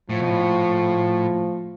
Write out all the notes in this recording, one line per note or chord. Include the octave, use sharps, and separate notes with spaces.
A2 F3
B2
A2